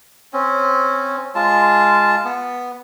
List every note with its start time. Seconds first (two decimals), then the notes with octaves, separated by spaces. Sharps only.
0.33 C4 C#4
1.35 G#3 F4 A5
2.25 B3